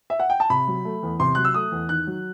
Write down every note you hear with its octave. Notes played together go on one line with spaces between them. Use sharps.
E5
F#5
G5
A5
C3 B5
F#3
A3
E2
C3 C6
F#3 F#6
E6
A3 D#6
E2
D#3 F#6
F#3